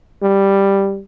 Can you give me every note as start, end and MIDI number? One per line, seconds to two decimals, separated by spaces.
0.23 1.01 55